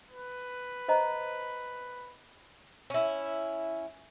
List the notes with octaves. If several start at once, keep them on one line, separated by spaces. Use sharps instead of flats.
B4
C5 D#5 A#5
C#4 E4